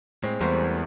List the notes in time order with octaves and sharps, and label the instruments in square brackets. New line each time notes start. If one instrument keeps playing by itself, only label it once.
[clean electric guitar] A2 [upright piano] G#3 C4
[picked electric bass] E2 [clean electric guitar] G3 A3 [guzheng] F#4 A#4 C5